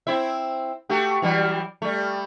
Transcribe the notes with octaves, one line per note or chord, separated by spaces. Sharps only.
C4 E4 E5
A3 F#4 G4
E3 F#3 G3
G3 A3